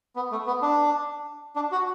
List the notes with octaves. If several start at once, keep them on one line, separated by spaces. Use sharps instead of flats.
B3
A3
B3
D4
D4
F#4